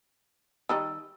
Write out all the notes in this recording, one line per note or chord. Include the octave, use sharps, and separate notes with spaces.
D#3 G3 D#4 E6